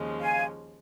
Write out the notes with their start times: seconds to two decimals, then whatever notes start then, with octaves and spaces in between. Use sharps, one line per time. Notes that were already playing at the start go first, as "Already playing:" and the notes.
Already playing: D#2 C#3 F3 G#3
0.21 F5 G#5